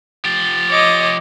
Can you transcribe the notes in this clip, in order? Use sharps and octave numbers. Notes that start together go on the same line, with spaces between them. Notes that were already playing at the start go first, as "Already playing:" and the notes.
F3 G4 A6
C#5 D#5 D6